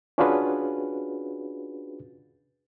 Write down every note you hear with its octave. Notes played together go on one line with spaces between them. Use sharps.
C#4 D4 F4 F#4 G#4 B4